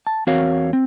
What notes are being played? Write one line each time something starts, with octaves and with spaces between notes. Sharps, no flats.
A5
E2 C4 F#4 A#4 C#5 F5
C4